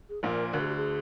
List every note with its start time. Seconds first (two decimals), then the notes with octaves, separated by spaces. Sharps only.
0.09 G#4
0.23 A#1 A#2 A#4
0.53 D2 D3 A#4
0.61 G#4
0.68 G4
0.76 G#4